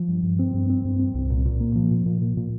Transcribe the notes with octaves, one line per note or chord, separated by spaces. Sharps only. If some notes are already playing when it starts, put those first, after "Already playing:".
Already playing: F3
G2
G2
C4
G2
C4
G2
C4
C2
A#2
A#2
A#3
F3
A#2
A#2
A#2
A#2